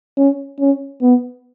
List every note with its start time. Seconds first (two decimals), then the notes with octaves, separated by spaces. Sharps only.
0.17 C#4
0.60 C#4
1.02 B3